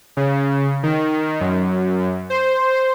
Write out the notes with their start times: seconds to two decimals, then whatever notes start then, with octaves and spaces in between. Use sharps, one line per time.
0.17 C#3
0.83 D#3
1.41 F#2
2.30 C5